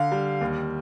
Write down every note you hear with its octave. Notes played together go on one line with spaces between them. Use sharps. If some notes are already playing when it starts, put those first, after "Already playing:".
Already playing: D3 F5
G3
D#2